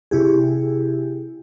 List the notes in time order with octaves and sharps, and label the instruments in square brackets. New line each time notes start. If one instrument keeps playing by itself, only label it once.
[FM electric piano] C3 E4 G4 G#4